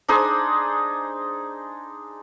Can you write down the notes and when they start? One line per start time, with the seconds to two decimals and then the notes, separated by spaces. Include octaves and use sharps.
0.08 D4 D#4 G#4 C5